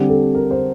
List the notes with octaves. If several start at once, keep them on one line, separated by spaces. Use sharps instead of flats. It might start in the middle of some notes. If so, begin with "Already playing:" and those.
Already playing: D3 G3 C4 G4
A4
A#4
C5